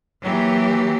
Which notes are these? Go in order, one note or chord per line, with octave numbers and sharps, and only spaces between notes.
E3 F#3 A#3 G4